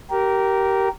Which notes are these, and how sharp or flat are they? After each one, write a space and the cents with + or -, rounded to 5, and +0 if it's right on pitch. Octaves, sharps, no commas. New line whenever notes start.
G4 -20 A#4 +0